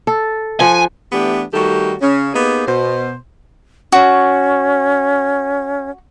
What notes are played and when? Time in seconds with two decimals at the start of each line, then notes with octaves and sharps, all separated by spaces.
0.07 A4
0.60 F3 F#5 G#5
1.12 E3 A3 B3 D4 G4
1.53 D#3 G3 A3 F#4 G4 A4
2.02 C#3 C#4
2.34 A#3 B3 D#4 G4 G#4
2.67 B2 C5
3.92 C#4 F#4